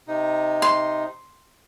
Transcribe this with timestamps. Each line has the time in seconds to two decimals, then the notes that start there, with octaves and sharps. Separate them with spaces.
0.07 C3 D#4
0.62 C6